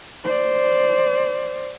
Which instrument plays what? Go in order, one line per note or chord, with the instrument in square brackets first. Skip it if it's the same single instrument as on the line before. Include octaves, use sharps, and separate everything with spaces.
[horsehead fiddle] C5 D5